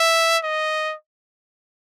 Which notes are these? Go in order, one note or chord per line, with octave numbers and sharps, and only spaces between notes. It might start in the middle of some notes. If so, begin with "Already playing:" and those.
Already playing: E5
D#5